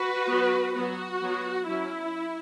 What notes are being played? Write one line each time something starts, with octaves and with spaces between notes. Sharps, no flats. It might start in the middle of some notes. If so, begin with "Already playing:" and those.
Already playing: F#4 B4
B3
F#3
F#3 B3 F#4
F#3 B3
F#3 C#4 E4